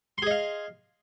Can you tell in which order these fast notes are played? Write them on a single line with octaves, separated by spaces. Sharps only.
C6 G#4 D#5 F5